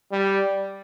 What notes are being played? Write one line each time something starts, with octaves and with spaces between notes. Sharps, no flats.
G3